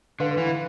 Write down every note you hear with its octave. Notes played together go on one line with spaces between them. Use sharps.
D3 B4 F5 C6
E3